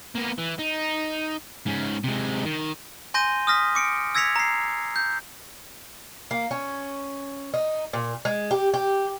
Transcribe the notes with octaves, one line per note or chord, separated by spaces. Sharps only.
A#3 B3
E3
D#4
G#2 C#4
C3 G#3
D#3
G#5 C6 G6 A#6 D#7 G7
D#6 F6 A#6 B6
D6 C#7 D7
E6 G#6 A#6 B6 C#7 F7
A#5 C7
G6
A#3
C#4
D#4
A#2
G#3
G4
G4